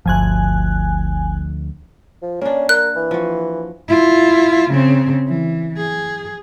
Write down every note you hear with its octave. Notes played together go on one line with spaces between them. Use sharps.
G1 D2 F3 G#5 F#6
F3
A#3 C#4 D4
A#4 F#6
E3
F3 F#4
E4 F4
C#3 C4
E3
G#4